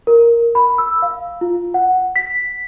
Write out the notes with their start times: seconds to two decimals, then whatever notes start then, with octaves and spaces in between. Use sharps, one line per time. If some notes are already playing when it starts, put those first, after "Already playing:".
0.07 A#4
0.55 B5
0.78 E6
1.02 F5
1.41 F4
1.74 F#5
2.16 B6